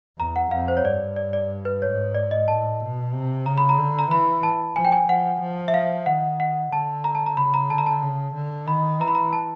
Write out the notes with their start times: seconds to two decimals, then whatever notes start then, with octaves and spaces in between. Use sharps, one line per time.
0.18 E2 A#5
0.36 F#5
0.51 F2 F5
0.68 C5
0.77 C#5
0.84 G2 D5
1.16 D5
1.33 D5
1.65 B4
1.82 G#2 C#5
2.15 D5
2.31 D#5
2.48 A2 A5
2.80 B2
3.13 C3
3.46 C#3 A#5
3.58 B5
3.69 A#5
3.78 D3
3.99 A#5
4.11 E3 B5
4.43 A5
4.76 F3 G#5
4.85 G5
4.92 G#5
5.08 F3 F#5
5.41 F3
5.68 E5
5.74 F5
6.06 D#3 F#5
6.40 F#5
6.72 D3 A5
7.04 A#5
7.15 A5
7.26 A#5
7.37 C#3 B5
7.54 A#5
7.70 D3 A5
7.78 A#5
7.86 A5
8.02 C#3
8.35 D3
8.67 D#3 B5
9.00 E3 A#5
9.08 B5
9.15 A#5
9.33 A5